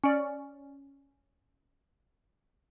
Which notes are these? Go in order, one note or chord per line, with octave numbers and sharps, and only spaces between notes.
C#4 D5